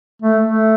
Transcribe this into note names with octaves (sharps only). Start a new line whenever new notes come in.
A3
A3